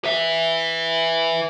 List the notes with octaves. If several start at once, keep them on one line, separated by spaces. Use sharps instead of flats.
B4 E5